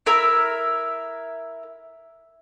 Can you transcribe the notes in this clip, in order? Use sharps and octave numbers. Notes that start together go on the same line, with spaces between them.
E4 A#4 E5 A#5